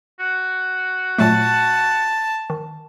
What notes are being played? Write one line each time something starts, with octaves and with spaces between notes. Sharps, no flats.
F#4
A#2 F#3 A3 A5
D#3